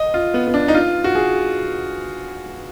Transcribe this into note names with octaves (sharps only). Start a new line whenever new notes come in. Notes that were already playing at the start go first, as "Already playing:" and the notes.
Already playing: D#5
F4
B3
B3
D4
D#4
F4
F#4
G#4